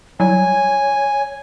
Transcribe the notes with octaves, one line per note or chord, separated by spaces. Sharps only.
F#3 G3 E4 C#5 G#5